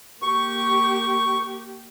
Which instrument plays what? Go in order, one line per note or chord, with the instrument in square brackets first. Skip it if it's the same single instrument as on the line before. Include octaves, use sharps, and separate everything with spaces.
[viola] A#3 G4 [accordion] C#6